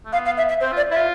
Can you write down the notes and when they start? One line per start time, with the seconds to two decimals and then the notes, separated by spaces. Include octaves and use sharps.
0.05 A3
0.13 B3 F5
0.26 F5
0.37 E5
0.49 E5
0.61 C4 C5
0.72 F4
0.77 D5
0.91 E4 E5
0.96 F4